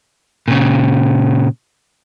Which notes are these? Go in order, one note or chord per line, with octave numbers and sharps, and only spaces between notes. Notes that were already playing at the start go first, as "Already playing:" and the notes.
A#2 C#3